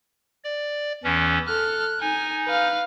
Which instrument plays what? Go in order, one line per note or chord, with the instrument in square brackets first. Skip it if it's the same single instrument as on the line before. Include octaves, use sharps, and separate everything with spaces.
[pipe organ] D5
E2 E3 C#4
[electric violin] A4 F6 [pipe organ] F#6
[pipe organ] D#4 [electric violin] G#5
[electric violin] B4 F5